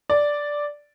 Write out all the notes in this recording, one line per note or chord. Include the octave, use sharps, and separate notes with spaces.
D5